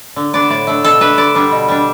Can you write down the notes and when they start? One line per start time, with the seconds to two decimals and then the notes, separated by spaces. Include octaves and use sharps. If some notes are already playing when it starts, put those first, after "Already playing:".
0.16 D3
0.33 B3 D4 D5
0.50 A2 D5
0.67 A3 D4
0.84 B2 A4
1.01 A3 D4 B4
1.17 D3 D5
1.35 G3 B3 D4
1.52 B2
1.68 G3 D4